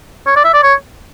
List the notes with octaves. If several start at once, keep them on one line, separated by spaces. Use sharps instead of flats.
C#5
D5
E5
D5
C#5